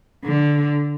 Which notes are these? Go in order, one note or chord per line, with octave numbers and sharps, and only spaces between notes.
D3